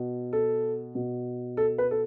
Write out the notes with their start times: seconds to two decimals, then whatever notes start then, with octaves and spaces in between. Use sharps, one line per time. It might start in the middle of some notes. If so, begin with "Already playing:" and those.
Already playing: B2
0.33 A4
0.95 B2
1.57 A4
1.78 B4
1.91 A4